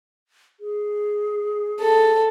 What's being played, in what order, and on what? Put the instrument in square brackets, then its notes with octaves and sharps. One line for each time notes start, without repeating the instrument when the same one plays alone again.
[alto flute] G#4
[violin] A4